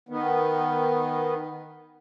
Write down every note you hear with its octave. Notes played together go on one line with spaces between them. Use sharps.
D#3 B3